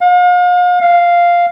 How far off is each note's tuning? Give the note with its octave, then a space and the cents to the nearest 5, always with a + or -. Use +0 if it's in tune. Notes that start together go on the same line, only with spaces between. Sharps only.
F5 +40
F5 -5